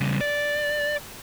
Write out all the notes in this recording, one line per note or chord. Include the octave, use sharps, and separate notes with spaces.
C#3 G3
D5